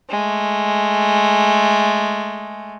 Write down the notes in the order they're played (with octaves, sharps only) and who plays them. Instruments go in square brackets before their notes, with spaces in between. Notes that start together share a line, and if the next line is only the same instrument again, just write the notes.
[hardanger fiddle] G#3 A3